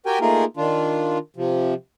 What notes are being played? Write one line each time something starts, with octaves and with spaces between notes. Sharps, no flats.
F#4 G4 A#4 G5 G#5
A3 A#3 D#4 F4 G#4 A#4
D#3 D4 F4
C3 F3